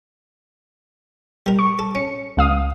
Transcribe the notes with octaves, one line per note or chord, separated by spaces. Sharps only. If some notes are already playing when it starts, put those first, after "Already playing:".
G3 A#4
C#6
A4
C#4 C#7
C#2 F5 D#6